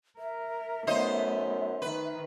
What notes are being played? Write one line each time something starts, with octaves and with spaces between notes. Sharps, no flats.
A#4 E5
F#2 A3 B3 D#4 C5 D#5
D#3 B4